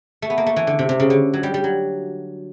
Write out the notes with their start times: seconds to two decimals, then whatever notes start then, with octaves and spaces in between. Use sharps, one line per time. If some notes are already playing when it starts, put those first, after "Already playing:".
0.22 A3
0.30 B3
0.38 A#3
0.46 A3
0.56 E3
0.67 D3
0.79 C3
0.89 C3
1.00 C#3
1.10 D3
1.34 F#3
1.43 G3
1.54 G3
1.64 F#3